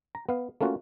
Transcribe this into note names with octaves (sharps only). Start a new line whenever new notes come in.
A#5
B3 F5
A3 A#3 C#4 F4 F#4